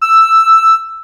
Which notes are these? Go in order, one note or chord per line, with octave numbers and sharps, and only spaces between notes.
E6